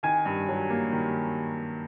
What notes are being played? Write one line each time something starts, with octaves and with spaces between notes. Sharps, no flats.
D#3 G#5
G2
F#3
A#3
D#3